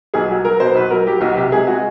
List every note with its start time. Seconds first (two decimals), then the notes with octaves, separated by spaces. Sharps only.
0.14 B1 G#4
0.30 F#3
0.45 F#3 A#4
0.60 B2 C5
0.75 B1 B4
0.90 F#3 A#4
1.07 F#3 G4
1.21 B1 F#4
1.36 C3 G4
1.52 G#3 G#4
1.67 G#3 F#4